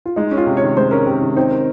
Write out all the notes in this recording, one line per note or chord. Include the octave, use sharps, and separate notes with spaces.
F4
G#3 D#4
C#4
F4
C3
C#5
D#3
G#3 C5
C#4 A#4
C3
D#3
C4 D#4
A#4